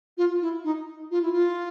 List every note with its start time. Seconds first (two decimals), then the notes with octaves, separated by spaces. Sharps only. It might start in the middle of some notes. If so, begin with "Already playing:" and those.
0.18 F4
0.42 E4
0.64 D#4
1.11 F4
1.22 E4
1.33 F4